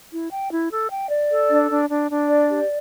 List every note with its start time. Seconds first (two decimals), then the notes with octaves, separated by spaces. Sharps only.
0.11 E4
0.31 G5
0.51 E4
0.71 A4
0.90 G5
1.10 D5
1.30 A4
1.50 D4
1.70 D4
1.89 D4
2.10 D4
2.29 D5
2.49 G4